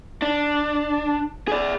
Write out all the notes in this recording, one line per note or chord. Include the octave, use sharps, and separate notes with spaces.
D4
G#4 D5